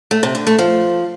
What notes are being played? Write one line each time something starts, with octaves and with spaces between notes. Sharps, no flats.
A3
C3
D3
A3
F3